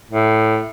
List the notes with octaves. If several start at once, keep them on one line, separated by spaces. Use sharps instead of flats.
A2